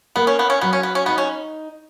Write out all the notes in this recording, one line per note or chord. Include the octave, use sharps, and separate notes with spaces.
A#3 B3
C#4
B3
C#4
F#3 B3
C#4
B3
C#4
B3 D#4
C#4